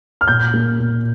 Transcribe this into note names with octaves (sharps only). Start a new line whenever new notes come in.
F6
A#2 G6
A#3
A#2